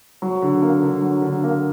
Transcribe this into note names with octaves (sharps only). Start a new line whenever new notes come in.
F#3
D3
A#3
D3
F#3
D3
A#3